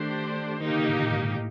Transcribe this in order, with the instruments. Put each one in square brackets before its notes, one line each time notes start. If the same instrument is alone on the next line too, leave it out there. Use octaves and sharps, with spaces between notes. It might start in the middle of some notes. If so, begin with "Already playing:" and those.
Already playing: [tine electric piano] D#3 [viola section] A3 D4 G4 C5
[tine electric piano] D#3 [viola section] A#3 D#4 G4
[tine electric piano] D3
C#3
A2
A#2
G#2
G#2
A2